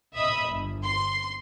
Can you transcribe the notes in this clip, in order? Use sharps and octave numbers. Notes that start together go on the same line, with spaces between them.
D#5 E5 B5 D#6
G1
C6